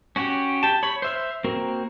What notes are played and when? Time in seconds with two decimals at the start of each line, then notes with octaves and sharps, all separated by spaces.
0.16 C#4 F#4 G4
0.63 G4 A5
0.83 C#5 B5
1.02 C5 E5 F6
1.44 A#3 C4 F#4 A#4